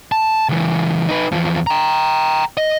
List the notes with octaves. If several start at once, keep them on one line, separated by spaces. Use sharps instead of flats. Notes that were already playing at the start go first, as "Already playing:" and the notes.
A5
C#2 E3
D#4 B4
E2 F3
G5 A#5
D#5